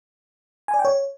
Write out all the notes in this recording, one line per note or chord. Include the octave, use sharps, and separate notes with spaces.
G#5
D5
G5
C#5